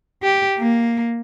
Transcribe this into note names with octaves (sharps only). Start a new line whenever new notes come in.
G4
A#3